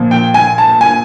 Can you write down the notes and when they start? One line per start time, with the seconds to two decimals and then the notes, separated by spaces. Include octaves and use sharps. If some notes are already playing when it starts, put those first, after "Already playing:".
Already playing: A#2 F3
0.11 G5
0.34 G#5
0.58 A5
0.81 G#5